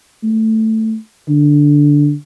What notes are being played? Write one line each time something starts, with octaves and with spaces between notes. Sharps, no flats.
A3
D3